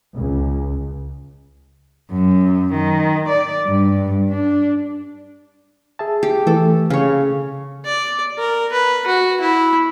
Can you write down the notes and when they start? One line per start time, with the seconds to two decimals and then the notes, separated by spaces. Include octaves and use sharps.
0.15 C#2
2.11 F#2
2.73 D#3
3.28 D5
3.66 G2
4.29 D4
5.99 G#4 E5 A5
6.23 G4
6.47 E3 A3 A4
6.90 C#3 C#5 F5
7.85 D5
8.38 A#4
8.72 B4
9.07 F#4
9.40 E4